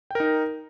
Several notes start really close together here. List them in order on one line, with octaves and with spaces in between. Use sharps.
G5 A#4 D#4